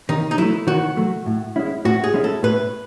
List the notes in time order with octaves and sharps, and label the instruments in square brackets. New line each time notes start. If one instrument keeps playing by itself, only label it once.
[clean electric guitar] D#3 [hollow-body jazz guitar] D#4
[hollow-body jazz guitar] D#4
[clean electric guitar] F#3 A3 [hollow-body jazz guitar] E4
[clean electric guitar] D#3 [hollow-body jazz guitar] F#4
[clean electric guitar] F#3 A3
A2
G#3 C#4 E4
[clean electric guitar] A2 [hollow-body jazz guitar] F#4
[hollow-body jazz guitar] G#4
[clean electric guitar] G#3 C#4 E4
[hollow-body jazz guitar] A4
[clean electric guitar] A2 [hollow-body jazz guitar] B4